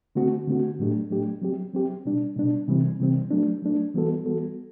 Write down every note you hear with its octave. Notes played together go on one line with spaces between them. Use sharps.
D3 A3 C4 F#4
D3 A3 C4 F#4
A2 F#3 A3 D4 G4
A2 F#3 A3 D4 G4
F#3 C4 G4
F#3 C4 G4
B2 G3 D4
B2 G3 D4
C3 E3 G3 C4
C3 E3 G3 C4
F#3 A3 D4
F#3 A3 D4
E3 G3 B3 F#4 A4
E3 G3 B3 F#4 A4